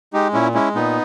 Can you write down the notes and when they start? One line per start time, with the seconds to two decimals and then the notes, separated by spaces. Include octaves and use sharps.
0.14 G#3 D#4 G4
0.34 A#2 C#4 E4
0.54 G#3 C#4 E4
0.75 A#2 B3 D#4